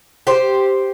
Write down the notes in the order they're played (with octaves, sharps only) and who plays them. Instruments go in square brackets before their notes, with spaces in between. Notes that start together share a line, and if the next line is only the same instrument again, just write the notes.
[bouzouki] G4 C5